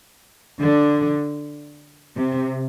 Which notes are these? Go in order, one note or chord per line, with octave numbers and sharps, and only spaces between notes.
D3
C3